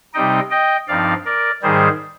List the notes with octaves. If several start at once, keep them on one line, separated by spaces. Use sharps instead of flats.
C3 G3 C4 D#4 D#5 G5
D#5 G5
G2 F3 C4 D#4 D5 F5
A#4 D5
G#2 D#3 G3 G#4 C5